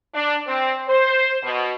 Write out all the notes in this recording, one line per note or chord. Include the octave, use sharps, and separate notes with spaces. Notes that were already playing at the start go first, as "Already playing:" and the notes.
D4
C4
C5
B2